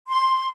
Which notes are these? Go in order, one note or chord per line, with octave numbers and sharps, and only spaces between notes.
C6